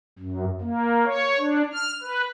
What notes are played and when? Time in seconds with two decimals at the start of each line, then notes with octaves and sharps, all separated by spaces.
0.19 F#2
0.61 A#3
1.05 C#5
1.39 D4
1.73 F6
2.02 B4